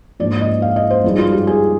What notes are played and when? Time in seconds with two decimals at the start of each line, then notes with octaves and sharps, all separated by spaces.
0.20 G#2 F3 A#3 D4 D5
0.41 D#5
0.62 F5
0.76 D#5
0.90 C5
1.04 G2 F3 G#3 D#4
1.18 F4
1.33 G4
1.47 G#4